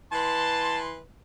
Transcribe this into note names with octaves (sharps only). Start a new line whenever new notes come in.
E3 B4 A5 C6